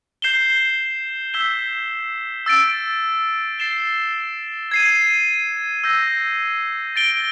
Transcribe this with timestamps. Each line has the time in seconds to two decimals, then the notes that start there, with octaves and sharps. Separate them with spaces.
0.22 G6 C7 E7 G7
1.34 E6 G6 B6 E7 G7
2.46 E6 A6 D7
3.59 A6 C7 E7 G7
4.71 G#6 C7 D#7
5.84 E6 G6 A#6
6.96 A6 D7 G7